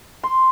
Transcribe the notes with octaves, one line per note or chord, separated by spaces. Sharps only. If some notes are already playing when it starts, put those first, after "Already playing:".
C6